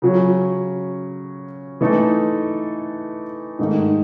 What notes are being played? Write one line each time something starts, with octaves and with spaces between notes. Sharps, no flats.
C#3 F#3 C#4
E3 A3 D#4 A4
G#2 D#3 A3 D#4